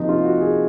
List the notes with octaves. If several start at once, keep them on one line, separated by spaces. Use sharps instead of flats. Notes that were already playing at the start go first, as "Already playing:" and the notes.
Already playing: C3 F3 A#3 D#4
F4
F#4
G#4